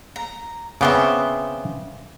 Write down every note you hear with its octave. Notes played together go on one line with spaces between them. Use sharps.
A#5
C#3 B3 C4 E5 C6 D6